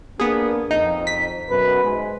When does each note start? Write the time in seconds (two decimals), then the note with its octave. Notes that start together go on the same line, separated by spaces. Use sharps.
0.19 A#3 B3 D4 G#4
0.71 F2 D#4
1.07 B6
1.49 F#2 B2 B4
1.84 G#2 G#3